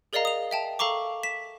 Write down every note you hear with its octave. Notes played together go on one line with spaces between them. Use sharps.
G#4 A#4 D5 D#5 F5 A#5
D#6 F7
E5 G5 A5
A4 F5 A#5 C#6 D6
B6 E7